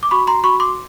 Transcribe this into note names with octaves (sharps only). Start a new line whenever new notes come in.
D6
F#4 B5 C#6
A#5 C6
F#4 B5 C#6
C6 D6